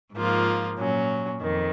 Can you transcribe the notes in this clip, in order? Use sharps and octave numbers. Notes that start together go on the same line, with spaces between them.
G#2 F3 A#3 F4
A#2 F#3 C#4
F2 D#3